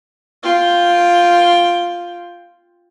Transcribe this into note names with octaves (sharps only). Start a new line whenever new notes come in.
F4 G5